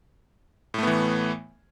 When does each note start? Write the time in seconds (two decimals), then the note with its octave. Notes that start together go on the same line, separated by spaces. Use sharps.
0.74 A2
0.78 A3
0.83 B3
0.87 E3